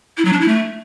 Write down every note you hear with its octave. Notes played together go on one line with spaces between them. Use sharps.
E4
F#3
D4
E4
A3